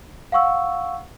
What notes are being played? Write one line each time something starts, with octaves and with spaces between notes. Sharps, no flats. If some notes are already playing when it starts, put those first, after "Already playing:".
F5 F#5 C#6 E6